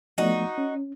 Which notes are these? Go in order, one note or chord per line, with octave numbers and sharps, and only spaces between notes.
F3 A3 B3 D#4 F#4
C#4